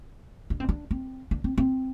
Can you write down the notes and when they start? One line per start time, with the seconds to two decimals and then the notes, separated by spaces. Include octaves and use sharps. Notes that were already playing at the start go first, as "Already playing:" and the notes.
0.50 D4
0.60 C4
0.69 D4
0.91 C4
1.31 D4
1.44 C4
1.58 C4